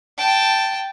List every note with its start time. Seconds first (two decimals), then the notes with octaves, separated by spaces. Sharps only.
0.18 G5 A5